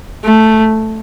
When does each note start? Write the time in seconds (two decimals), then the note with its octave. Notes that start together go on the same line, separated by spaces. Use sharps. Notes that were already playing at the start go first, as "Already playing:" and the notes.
0.24 A3